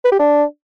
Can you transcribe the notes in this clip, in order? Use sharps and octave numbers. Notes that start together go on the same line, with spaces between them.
B4
G4
D4